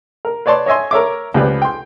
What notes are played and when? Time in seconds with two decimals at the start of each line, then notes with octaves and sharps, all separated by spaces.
0.25 A#4
0.46 B4 C#5 D5 A5 C6
0.66 C#5 D#5 E5 G#5 C6
0.91 A#4 C#5 E5 D6
1.34 C#2 F3 G4 B4 D5
1.62 G5 C6